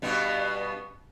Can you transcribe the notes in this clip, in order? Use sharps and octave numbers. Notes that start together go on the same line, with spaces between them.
G2 B2 B3